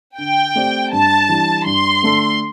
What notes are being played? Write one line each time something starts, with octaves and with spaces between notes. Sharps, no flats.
D3 G5
A3 C4 G4 D5
G2 A5
E3 G3 D4
G2 C6
D3 A3 D4 A4